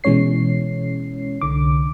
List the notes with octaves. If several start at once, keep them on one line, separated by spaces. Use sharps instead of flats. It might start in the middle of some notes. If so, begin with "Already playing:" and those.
B2 E3 G#3 C#4 C#5 C7
C2 D3 D6